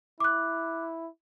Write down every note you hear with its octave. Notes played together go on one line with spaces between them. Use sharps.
E4 D6 F#6